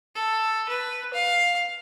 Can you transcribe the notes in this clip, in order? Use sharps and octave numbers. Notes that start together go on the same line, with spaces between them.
A4
B4
F5